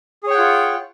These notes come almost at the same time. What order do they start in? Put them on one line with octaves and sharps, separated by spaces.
G#4 C#5 G5 F#5 F4